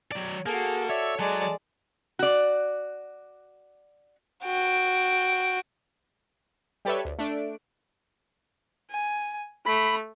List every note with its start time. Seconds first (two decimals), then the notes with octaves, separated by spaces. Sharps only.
0.12 F#3 D5
0.46 A#3 F#4 G#4 A4
0.89 C#5 D5 E5 E6
1.19 F#3 G#3 D5 A5
2.19 F#4 D5
4.45 F#4 G5
6.85 G3 G4 A4 B4 C#5 E5
7.05 D2
7.19 A3 D4 D7
8.91 G#5
9.66 A3 B5